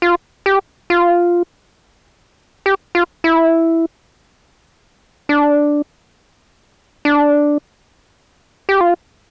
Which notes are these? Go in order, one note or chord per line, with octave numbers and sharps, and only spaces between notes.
F4
G4
F4
G4
F4
E4
D4
D4
G4
F4